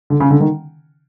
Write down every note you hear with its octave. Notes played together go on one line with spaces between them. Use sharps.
D3
C#3
D3
D#3